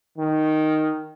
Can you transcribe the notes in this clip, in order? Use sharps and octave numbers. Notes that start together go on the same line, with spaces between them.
D#3